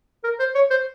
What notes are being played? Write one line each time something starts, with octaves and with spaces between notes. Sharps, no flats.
A#4
C5
C#5
C5